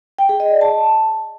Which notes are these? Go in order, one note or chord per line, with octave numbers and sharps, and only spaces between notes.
G5
G#4
D#5
D5
A5